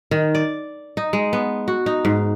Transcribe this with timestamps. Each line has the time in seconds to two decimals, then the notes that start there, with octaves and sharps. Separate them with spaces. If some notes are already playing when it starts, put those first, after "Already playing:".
0.11 D#3
0.35 D5
0.97 D#4
1.13 G#3
1.33 B3
1.68 F#4
1.86 D#4
2.05 G#2